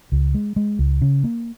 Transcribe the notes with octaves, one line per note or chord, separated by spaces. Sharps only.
C#2
G#3
G#3
C#2
C#3
A#3